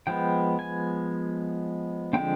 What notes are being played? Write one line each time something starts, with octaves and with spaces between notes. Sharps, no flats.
F3 G#3 B3 G5
G#5
D3 F3 G#3 C4 G5